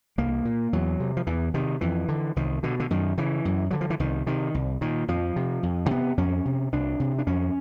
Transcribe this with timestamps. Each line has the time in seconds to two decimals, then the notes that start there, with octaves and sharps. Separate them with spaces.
0.18 C2 A#3
0.45 A#2
0.73 E2 F#3
1.00 C3
1.17 F3
1.27 E2 E3
1.54 C3 D#3
1.81 F2 E3
2.08 D3
2.36 C2 D#3
2.63 B2 D3
2.80 D3
2.90 F#2 D#3
3.18 C#3 E3
3.45 F#2
3.71 D3 F#3
3.81 F3
3.90 E3
4.00 C2 D#3
4.27 C3 D#3
4.54 C2
4.81 A#2 D#3
5.08 F2 F3
5.36 C3
5.63 F2
5.86 A#3
5.91 C3 B3
6.18 F2 C#4
6.45 C3
6.72 C2 D4
7.00 C3
7.18 D4
7.27 F2 C#4